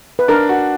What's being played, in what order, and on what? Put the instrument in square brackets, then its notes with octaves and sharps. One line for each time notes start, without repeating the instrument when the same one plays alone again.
[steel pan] B4
[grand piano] D4 [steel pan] A#4
[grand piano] F#4